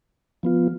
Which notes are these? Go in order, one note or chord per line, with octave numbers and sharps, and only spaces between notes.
F3 B3 F4